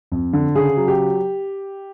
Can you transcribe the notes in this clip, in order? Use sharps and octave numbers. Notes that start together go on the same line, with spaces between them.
F2
D3
C#3 G#4
F#3
G4